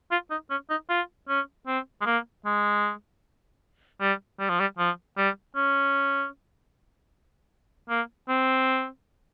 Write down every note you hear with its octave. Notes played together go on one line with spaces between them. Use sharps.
F4
D#4
C#4
D#4
F4
C#4
C4
G#3
A#3
G#3
G3
G3
F3
G3
F3
G3
C#4
A#3
C4